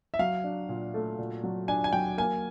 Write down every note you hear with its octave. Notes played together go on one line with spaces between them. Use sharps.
E5
F#3 F5
D4
A#2
A3
A#2
F#3
D4 G#5
G#5
F#3 G5
A#3 G#5